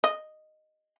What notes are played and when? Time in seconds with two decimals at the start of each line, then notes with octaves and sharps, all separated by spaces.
0.04 D#5